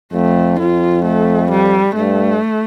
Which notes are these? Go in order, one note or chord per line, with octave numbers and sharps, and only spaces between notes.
F2 A3
F2 F4
A3
G3
G2 A3